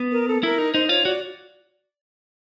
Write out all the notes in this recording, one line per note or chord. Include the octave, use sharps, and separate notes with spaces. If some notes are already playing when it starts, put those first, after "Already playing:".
Already playing: B3
A#4
A4
E4 A#4
D#4
D#4 C5
F4 C#5
F#4 D5